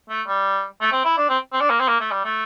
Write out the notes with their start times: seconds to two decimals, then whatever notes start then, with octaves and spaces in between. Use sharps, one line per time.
0.09 A3
0.27 G3
0.81 A3
0.92 C4
1.05 E4
1.17 D4
1.29 C4
1.52 C4
1.61 D4
1.70 A#3
1.80 C4
1.88 A#3
2.00 A3
2.12 G3
2.25 A3